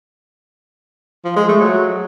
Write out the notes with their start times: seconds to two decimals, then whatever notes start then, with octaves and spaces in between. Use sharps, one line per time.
1.24 F3
1.36 G#3
1.48 A3
1.60 F#3